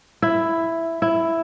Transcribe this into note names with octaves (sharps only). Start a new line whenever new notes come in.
E4
E4